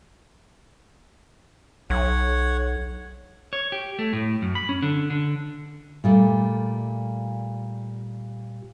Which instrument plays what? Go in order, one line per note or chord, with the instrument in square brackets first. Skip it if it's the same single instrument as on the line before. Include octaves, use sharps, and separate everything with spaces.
[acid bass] B1 [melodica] C#5 F#5
[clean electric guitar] C#5
G4
A3
A2
F#2
B5
C#4
D3
D3
[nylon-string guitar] A#2 G3 A3